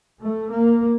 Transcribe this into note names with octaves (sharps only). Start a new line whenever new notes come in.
A3
A#3